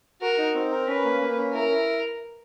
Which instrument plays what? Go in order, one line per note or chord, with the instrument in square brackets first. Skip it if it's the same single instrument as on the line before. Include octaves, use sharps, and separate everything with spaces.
[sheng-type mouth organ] F#4 [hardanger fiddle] A#4
[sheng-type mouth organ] D#4
C4
A#4
[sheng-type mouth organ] C#4 [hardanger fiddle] B4
[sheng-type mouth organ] A#3
A#3
C#4
[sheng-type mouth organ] E4 [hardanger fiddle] A#4
[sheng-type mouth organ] E4